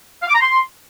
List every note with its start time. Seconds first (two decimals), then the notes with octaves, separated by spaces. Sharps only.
0.23 F5
0.28 D6
0.34 A#5
0.40 C6